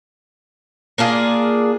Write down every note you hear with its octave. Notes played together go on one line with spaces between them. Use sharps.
A#3 D4 F4 G#4